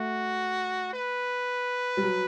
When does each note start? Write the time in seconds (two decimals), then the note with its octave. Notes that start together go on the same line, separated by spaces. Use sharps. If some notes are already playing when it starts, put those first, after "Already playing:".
Already playing: A3 F#4
0.93 B4
1.97 G3
2.03 F#3